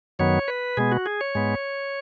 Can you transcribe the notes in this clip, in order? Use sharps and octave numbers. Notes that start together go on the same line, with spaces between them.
F#2 D#3 F#3 B3 C#5
B4
B2 G#3 B3 G#4
F#4
G#4
C#5
G#2 G#3 B3